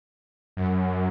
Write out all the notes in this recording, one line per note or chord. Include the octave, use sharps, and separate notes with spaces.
F#2